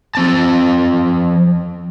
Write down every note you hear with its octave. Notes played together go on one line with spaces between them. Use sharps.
F3 C4 A5